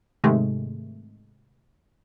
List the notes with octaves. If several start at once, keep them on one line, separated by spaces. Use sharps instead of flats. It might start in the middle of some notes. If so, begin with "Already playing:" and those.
G#2 C3 D#3 G#3 A3